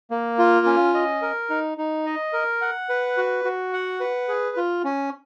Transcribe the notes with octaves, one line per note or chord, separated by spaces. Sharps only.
A#3
F4
C#4
D#5
A#4
D#4
D#4
D#5
A#4
F#5
B4
F#4
F#4
F#5
B4
G#4
F4
C#4